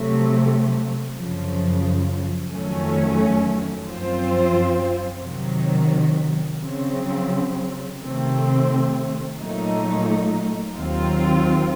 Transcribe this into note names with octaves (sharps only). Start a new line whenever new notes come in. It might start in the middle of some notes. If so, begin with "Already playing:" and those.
Already playing: C3 F#3 A3
F#2 C#3 F3
F2 D#3 F#3 A3 C#4
F#2 F3 C4 F4 C5
C3 D#3 F#3
C#3 F#3 C4
C3 D#3 A3 C4
A#2 F#3 A3 D#4
D#2 D#3 F#3 C4 F4